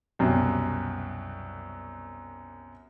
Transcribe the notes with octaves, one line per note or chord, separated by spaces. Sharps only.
C2 F#2 B2